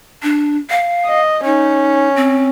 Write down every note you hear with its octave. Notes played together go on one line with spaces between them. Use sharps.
D4
F5
D#5
C#4 D#4
C4